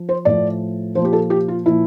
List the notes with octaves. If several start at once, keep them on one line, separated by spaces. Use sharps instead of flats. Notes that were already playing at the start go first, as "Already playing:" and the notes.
Already playing: F3
C5
A2 F3 D5
A#2 F3 C5
G4
A4
G4
F4
A#2 F3 E4